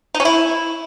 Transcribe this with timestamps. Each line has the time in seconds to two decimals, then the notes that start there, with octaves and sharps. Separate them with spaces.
0.15 D#4
0.20 C#4
0.25 E4